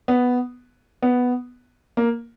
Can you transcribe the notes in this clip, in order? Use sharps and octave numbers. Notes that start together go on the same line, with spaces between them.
B3
B3
A#3